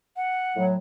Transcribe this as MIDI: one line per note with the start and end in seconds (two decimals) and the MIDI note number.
0.16 0.65 78
0.56 0.76 45
0.56 0.76 54